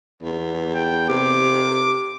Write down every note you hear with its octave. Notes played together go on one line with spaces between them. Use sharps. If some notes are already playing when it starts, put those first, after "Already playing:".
E2
G5
C3 D6